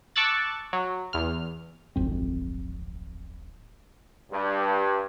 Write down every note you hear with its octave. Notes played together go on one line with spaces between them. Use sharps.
A5 C#6 D6 E6 F#6 A6
F#3
E2 F6
D1 G#1 F2 C4
G2